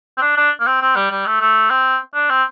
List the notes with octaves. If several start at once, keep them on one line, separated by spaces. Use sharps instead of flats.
C4
D4
D4
A#3
C4
C4
G3
G3
A3
A3
C4
D4
C4